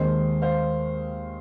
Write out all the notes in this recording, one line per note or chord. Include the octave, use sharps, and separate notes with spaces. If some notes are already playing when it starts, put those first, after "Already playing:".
Already playing: D#2 D#3 G#3 C4 C5
C5 F5